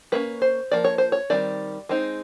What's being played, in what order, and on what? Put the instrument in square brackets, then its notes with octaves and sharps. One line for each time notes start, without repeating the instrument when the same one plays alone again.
[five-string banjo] G3 A#3 C#4 B4
C5
F3 A#3 D5
C#5
C5
C#5
D#3 G3 C4 D5
G#3 C4 D#4